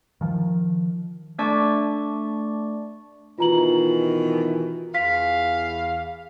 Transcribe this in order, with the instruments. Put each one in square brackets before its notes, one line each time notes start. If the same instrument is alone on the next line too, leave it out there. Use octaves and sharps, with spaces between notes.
[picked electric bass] D#3 F3
[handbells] A3 D4 D5 A5 C#6 D6
[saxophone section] B2 D#3 E3 [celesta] F4 A#5 F#7
[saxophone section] E2 F5 [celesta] B6